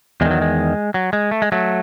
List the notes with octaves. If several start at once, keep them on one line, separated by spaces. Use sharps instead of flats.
E2 D#3 G#3
F#3
G#3
F#3
G#3
A3
G#3
F#3 A3